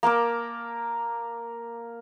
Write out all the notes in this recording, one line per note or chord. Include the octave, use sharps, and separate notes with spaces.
A#3 A#4 A5 D6